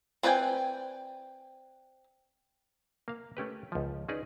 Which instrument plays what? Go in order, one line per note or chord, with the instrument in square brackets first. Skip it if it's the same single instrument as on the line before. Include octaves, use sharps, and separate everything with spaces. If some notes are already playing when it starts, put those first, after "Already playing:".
[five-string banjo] C4 B4 D5 G5 G#5
[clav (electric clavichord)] A#3 F5
A3 C#4 G4 B4
C#2 F3
C#4 D#4 G#4 B4 D5